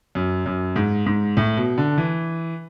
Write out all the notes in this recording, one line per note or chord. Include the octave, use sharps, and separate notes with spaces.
F#2
F#2
G#2
G#2
A2
B2
D3
E3